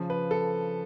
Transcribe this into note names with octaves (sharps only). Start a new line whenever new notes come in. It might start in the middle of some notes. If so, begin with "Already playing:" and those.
Already playing: C#3 F3
B4
A4